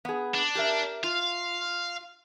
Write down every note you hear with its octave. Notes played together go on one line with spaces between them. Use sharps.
B3 G#4
D4
G4 A#4 E5
F4 F5